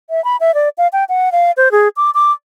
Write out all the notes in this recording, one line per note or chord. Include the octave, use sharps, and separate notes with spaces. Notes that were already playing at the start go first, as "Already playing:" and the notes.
E5
B5
E5
D5
F5
G5
F#5
F5
C5
G#4
D6
D6